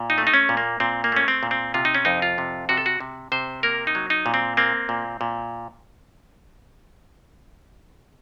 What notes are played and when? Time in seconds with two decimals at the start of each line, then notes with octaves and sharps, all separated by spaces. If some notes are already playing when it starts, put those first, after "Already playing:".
Already playing: A#2
0.10 D#4
0.18 A3
0.27 D#4
0.34 C#4
0.49 A#2
0.57 A#3
0.80 A#2 C4
1.04 A#3
1.12 A3 C#4
1.28 C4
1.43 A#2
1.51 C4
1.74 C3 F4
1.85 D#4
1.95 C#4
2.05 F2 D#4
2.22 F4
2.38 C3
2.69 C3 F#4
2.77 A4
2.86 F#4
3.00 C3
3.32 C3 C5
3.63 A#3 A#4
3.87 D#4
3.95 F#3
4.10 D#4
4.26 A#2
4.34 C4
4.57 A#3 C4
4.89 A#2
5.21 A#2